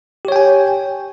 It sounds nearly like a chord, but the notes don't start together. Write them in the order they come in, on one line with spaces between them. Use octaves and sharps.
G4 C#5 G5 G#5